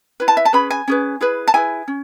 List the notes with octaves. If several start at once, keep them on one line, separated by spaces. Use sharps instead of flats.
E4 B4
A5
E5
A5
C#4 G#4 B4 B5
G#5
C#4 G#4 B4
E4 G#4 B4
A5
E4 G#4 B4 G#5
C#4